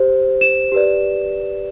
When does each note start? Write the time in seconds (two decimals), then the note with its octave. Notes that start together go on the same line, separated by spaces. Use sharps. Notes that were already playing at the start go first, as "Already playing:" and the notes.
Already playing: G4 C5
0.41 E7
0.72 G4 B4 D5